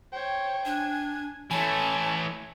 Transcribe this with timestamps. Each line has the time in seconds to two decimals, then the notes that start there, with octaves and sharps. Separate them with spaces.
0.13 C5 C#5 G5
0.65 D4 G#5
1.51 E3 A3 C#5 G#5 A5